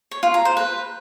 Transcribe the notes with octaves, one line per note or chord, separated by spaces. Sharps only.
C#5
F4
A#5
C5
B4